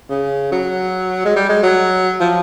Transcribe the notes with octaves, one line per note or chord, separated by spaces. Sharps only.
C#3
F#3
G#3
G3
G#3
F#3
F3